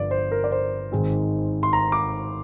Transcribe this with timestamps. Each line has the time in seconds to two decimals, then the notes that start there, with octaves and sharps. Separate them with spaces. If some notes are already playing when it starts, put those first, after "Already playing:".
Already playing: G1 G2 F3 D5
0.11 C5
0.32 A#4
0.44 D5
0.52 C5
0.92 G#1 G#2 D#3 G#3 C4
1.63 C6
1.73 A#5
1.92 D6